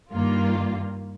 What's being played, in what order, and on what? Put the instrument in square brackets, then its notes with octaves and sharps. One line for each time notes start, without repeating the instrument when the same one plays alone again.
[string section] G2 D#3 A#3 F4